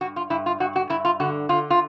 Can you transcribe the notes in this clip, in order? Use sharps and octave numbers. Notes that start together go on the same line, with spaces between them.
G2 F#4
F4
G2 E4
F4
G2 F#4
F#4
G2 E4
F4
D3 F#4
D3 F4
F4